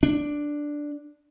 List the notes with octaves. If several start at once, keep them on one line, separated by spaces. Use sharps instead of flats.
D4